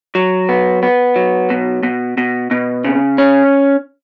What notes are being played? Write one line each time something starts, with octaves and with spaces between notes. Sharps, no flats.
F#3
B3
B3
F#3
B2
B2
B2
B2
C#3
C#4